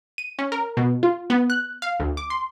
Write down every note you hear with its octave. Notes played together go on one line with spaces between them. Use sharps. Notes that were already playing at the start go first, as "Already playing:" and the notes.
D#7
C#4
A#4
B2
F4
B3
F#6
F5
D2
D6
C6